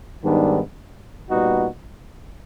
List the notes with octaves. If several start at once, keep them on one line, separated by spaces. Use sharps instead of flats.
G#2 D#3 G3 B3 D4
A#2 G3 B3 D#4 F#4